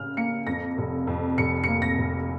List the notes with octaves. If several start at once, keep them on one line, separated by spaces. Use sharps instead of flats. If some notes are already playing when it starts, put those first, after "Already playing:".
Already playing: C#3 F6
A#3 C#7
F2 A#6
F1
F2
F1 C#7
A#3 C#7
A#6
F1